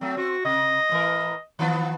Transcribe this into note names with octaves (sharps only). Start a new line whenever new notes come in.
F#3 A3 C4
C4 F#4
C3 D#5
A2 E3 A#4
D#3 F3 B3